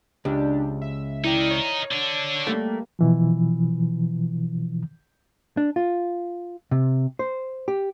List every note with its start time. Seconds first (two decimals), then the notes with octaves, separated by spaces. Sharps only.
0.25 C#2 D4 G4
0.82 E5
1.24 D#4 E4 A#4 D5 G5
1.50 C#5
1.91 D3 D4
2.47 G3 A3 A#3
2.99 B2 E3 F3
5.57 D4
5.76 F4
6.71 C3
7.19 C5
7.68 G4